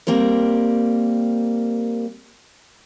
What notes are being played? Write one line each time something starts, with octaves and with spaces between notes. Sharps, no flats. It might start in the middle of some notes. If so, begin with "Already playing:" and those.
G3 A#3 C4 A#4